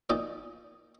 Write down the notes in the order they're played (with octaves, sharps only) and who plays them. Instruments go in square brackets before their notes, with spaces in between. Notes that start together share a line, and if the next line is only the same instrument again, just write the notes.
[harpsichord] A#2 D#4 D5